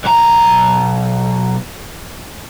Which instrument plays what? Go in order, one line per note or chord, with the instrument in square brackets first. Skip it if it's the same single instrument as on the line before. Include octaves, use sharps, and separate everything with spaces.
[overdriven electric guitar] B1 A#5